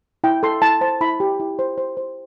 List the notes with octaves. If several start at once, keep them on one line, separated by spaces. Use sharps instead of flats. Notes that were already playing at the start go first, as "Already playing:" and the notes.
E4 G5
A4 C6
E4 A5
C5 A5
E4 B5
G4
E4
C5
C5
C5